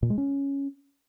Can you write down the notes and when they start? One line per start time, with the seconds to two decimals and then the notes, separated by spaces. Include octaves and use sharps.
0.03 A#2
0.10 G#3
0.18 C#4